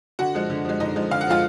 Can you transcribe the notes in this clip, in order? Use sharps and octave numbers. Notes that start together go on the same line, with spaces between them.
D3 F#4 F#5
F3 G#3
D3
F3 G#3
D3 D#4 D#5
F3 G#3
D3 F5
F#5
F3 G#3 F4 F5